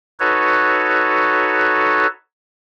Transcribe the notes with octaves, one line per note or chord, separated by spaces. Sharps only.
D#4 F#4 A4 B4 C#5